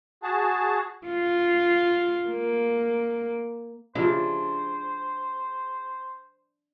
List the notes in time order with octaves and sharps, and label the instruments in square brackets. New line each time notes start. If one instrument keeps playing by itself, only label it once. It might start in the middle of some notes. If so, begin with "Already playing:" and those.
[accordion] F#4 G#4 A5
[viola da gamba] F4
A#3
[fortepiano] C#3 E4 [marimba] F3 F4 G4 [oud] D4 [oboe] C5